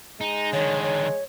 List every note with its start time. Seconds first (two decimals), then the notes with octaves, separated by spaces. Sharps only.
0.21 G#3 D#4
0.53 D3 D#3 C#5
0.83 C#5